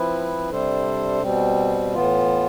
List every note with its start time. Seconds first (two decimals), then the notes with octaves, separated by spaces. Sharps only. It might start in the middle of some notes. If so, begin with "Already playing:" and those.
Already playing: F3 C4 E4 B4
0.49 C3 G3 D4 A4 C5
1.23 B2 G3 C4
1.94 A2 E3 B3 F4